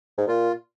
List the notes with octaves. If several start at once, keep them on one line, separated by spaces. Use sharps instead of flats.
G#2
A#2 F4